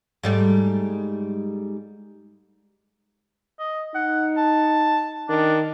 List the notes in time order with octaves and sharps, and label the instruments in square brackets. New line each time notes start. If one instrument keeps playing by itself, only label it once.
[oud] G#2 G3 A3
[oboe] D#5
[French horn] D#4 [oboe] F#5
[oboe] A5
[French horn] D#3 [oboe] D4